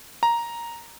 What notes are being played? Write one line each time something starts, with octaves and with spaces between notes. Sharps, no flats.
A#5